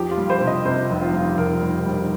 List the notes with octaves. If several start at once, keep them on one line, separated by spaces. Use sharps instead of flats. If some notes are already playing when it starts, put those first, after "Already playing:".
Already playing: F2 G4
F4
G3
C5
C3
D#5
C3 C5
F1
F4
G3
F1 A#4
G3
G3